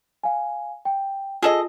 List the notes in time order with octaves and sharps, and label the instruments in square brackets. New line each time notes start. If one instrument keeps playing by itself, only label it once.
[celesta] F5 G#5
G5
[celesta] F4 [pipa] G#4 A4 D#5